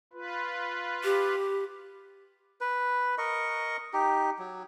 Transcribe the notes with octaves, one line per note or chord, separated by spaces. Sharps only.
F4 B4
G4
B4
A#4 D#5 C#6
D#4 G4
F#3